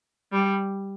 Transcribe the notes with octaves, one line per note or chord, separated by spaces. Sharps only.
G3